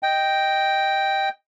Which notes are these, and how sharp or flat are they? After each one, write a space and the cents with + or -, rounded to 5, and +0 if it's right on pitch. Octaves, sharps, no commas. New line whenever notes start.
D#5 +0 G5 +0